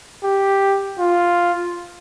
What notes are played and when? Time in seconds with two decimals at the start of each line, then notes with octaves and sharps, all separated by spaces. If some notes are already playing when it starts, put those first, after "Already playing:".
0.24 G4
0.99 F4